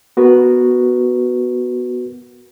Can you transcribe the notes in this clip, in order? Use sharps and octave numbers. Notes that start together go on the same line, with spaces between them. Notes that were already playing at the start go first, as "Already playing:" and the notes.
B3 F#4 A#4 B4